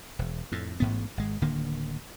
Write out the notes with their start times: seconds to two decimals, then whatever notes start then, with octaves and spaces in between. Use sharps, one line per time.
0.19 E1
0.52 F2 A2
0.80 A1 G#2 B3
1.17 G#1 G#3
1.42 D1 D3 D#3 A#3